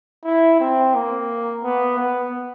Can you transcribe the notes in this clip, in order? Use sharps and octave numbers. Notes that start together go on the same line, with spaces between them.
E4
C4
A#3
B3
B3